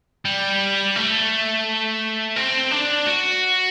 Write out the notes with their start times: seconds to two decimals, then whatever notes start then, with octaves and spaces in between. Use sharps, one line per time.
0.25 G3
0.96 A3
2.36 C4
2.71 D4
3.07 F#4